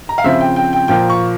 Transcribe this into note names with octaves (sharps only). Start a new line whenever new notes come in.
A#5
F5
C#3 F3 C4 E5
G5
G5
G5
A#2 F3 A#3 G5
C#6